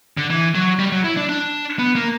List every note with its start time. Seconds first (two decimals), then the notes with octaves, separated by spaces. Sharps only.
0.17 D3
0.30 E3
0.55 F#3
0.79 G3
0.92 F#3
1.04 E4
1.17 D4
1.29 D4
1.79 B3
1.95 A#3